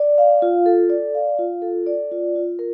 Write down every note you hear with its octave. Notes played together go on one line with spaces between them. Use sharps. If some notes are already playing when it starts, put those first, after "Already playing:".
Already playing: D5
F5
F4
A4
D5
F5
F4
A4
D5
F4
F4
A#4